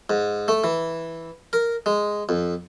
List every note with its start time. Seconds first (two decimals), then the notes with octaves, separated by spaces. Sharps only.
0.10 G#2
0.48 A3
0.64 E3
1.53 A#4
1.86 G#3
2.29 F2